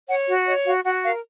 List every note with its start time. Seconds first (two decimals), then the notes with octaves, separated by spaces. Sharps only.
0.08 C#5 F#5
0.28 F#4
0.47 C#5 D#5
0.66 F#4 F5
0.85 F#4 F#5
1.04 A#4 F5